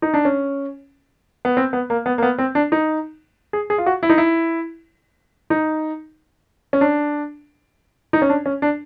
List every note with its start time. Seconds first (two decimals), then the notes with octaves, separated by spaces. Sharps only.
0.02 D#4
0.14 D4
0.25 C#4
1.45 B3
1.57 C4
1.73 B3
1.90 A#3
2.06 B3
2.18 A#3
2.23 B3
2.38 C4
2.55 D4
2.72 D#4
3.53 G#4
3.70 G#4
3.78 F4
3.86 F#4
4.03 E4
4.09 D#4
4.18 E4
5.50 D#4
6.73 C#4
6.81 D4
8.13 D#4
8.22 C#4
8.29 D4
8.46 C#4
8.62 D4